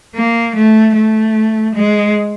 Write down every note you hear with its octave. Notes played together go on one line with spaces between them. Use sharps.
A#3
A3
A3
G#3